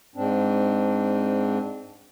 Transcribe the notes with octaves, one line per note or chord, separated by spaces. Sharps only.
G#2 C4 D4